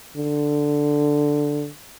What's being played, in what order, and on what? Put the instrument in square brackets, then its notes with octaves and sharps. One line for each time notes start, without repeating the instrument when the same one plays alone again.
[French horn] D3